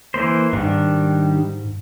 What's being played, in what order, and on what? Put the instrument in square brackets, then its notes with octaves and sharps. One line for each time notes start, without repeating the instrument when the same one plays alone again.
[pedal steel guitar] E3 A#3 C5
[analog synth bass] G#2 [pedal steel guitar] D#3 G3 D4